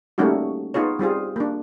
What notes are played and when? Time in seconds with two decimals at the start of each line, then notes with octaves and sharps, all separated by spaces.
0.18 G3 A3 A#3 C#4 D#4 F#4
0.74 B3 D#4 F4 G#4 C#5
0.99 G3 C4 F4 G#4
1.36 A#3 D4